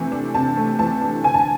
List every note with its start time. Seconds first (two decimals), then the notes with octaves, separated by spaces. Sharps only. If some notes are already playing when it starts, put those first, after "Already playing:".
Already playing: C3 E3 A3
0.12 D4
0.34 C3 A5
0.57 A3
0.79 E3 A5
1.01 D4
1.24 D3 G#5
1.34 A5